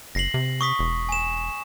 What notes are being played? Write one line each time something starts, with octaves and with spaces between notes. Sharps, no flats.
F#1 A#6 C7 F#7
C3
C#6 D#6 B6
E1
G#5 E7